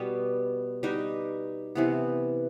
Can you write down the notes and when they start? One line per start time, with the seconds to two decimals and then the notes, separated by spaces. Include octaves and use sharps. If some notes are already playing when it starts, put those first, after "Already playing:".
Already playing: B2 G3 B3
0.83 G3 D#4 F#4 B4
1.75 C3 E3 B3